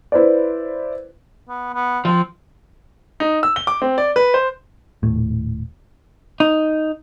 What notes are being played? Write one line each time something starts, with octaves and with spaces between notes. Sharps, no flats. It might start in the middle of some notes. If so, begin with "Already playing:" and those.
E4 B4 C5 D5
B3
B3
F3 C4
D#4
E6
G7
D6
C4
D5
B4
C5
D#1 A2
D#4